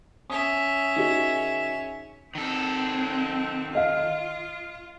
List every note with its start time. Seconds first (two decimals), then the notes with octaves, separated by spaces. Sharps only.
0.30 C#4 E5 D#6
0.96 D#3 F#4 G#4
2.35 D#3 C4 A4
3.75 F4 D#5 F5